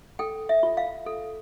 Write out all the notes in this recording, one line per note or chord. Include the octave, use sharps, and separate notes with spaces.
A4 G5
E5
F4
F5
A4